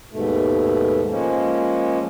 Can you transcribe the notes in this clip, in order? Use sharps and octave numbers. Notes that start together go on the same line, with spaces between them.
D#2 G#2 B2 A3
F3 G#3 A#3 C#4